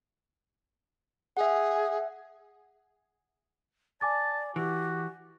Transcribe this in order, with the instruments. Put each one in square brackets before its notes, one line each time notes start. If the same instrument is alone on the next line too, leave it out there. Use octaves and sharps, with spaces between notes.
[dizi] G#4 [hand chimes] E5 F#5
[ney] D5 [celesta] G#5 D6 A6 [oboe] A5
[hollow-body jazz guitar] E3 [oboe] F#4 [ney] G4